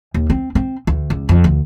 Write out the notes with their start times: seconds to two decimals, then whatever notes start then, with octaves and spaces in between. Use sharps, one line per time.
0.14 D#2
0.30 C4
0.55 C4
0.87 D2
1.10 C#2
1.29 F2
1.44 D2